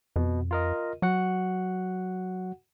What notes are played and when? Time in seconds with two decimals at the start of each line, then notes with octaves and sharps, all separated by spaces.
0.16 F2 B2
0.51 F4 A#4 D#5
1.02 F#3 F#4 F#5